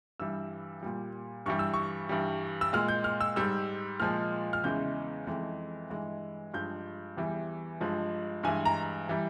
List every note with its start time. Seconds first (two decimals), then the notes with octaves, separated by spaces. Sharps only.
0.20 G2 E3 G3 E6
0.83 A#2 G3
1.46 G2 E3 G3 C#6
1.59 E6
1.74 C#6
2.09 G2 E3 G3
2.61 E6
2.73 A#2 G#3 F6
2.88 G6
3.04 F6
3.21 E6
3.36 G#2 G3 E6
4.00 A#2 F3 G#3 F6
4.53 F6
4.64 E2 C#3 E3 G#3 G6
5.27 F2 E3 G#3
5.90 G2 E3 G#3
6.54 G2 F3 G#3 G6
7.17 E2 E3 G3
7.81 G2 F3 G#3
8.43 G2 E3 G#3 G#5
8.65 A#5
9.09 E3 G3